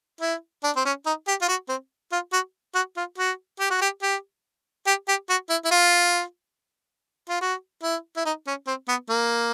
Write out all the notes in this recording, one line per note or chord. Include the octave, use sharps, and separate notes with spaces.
E4
D4
C4
C#4
D#4
G4
F4
F#4
C4
F4
F#4
F#4
F4
F#4
G4
F#4
G4
G4
G4
G4
F#4
E4
E4
F4
F4
F#4
E4
E4
D#4
C#4
C4
B3
A#3